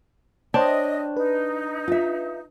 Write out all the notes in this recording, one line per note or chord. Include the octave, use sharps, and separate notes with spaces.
D4 C5 C#5 D#5 G5
D#4 B4
F4 E5